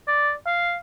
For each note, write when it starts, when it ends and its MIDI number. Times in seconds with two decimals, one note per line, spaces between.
0.07 0.32 74
0.47 0.75 77